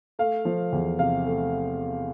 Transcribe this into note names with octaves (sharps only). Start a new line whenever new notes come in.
A3 F5
F3
E2
C3 F5
A3